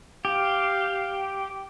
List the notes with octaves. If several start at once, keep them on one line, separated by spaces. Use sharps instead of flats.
G4 F5